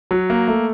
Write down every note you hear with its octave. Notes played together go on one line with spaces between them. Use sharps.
F#3
A#3
A3